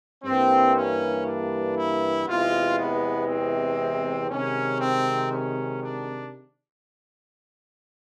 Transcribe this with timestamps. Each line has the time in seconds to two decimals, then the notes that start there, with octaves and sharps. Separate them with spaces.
0.24 G2 E3 G3 A#3 C4
0.75 C#4
1.26 D4
1.76 E4
2.27 E2 C3 E3 G#3 F4
2.78 B3
3.28 C4
4.30 C3 D#3 G#3 C#4
4.81 C4
5.32 C#4
5.82 D4